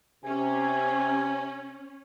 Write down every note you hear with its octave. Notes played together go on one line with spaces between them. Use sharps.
C3 C#4 G#5